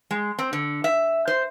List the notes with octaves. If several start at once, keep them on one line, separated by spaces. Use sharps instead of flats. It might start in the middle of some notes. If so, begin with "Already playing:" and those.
G#3
C4
D3
E5
C5